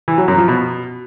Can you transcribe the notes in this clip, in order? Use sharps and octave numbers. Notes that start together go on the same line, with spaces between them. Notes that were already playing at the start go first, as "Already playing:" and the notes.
E3
F#3
F#2
F3
B2